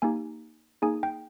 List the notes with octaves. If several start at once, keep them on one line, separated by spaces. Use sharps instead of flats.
A#3 D#4 G4 G#5
A#3 D#4 G#4 G#5
G5